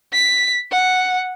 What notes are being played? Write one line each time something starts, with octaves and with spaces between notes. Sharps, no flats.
B6
F#5